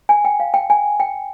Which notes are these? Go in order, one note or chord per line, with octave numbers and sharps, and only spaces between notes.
G#5
G5
F5
G5
G#5
G5